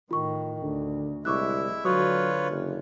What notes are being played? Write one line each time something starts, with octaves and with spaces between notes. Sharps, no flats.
A2 D#3 F4 C#6
D2 D3
C2 G#3 E4 E5 C#6 D6 F#6
D3 F#3 F4 F#4 B4 C#5 C#6 D#6
F#1